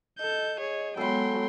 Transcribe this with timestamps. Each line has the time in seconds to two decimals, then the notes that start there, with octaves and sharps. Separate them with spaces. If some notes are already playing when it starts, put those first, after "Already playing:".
0.19 A4 D#5 G6
0.60 G#4 C#5
0.97 F#3 G#3 B3 A4 G5 B5 C6